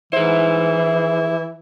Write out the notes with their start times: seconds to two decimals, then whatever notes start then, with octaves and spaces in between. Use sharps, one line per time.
0.13 E3 E4 G#4 C5